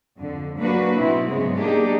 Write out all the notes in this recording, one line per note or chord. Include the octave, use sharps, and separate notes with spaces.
F2 D3
F#3 A#3 D4 F#4 B4
B2 B3 C4 E4
G#2 C#3 F#3 G#3 B3
G#3 A#3 D4 D#4 G4 G#4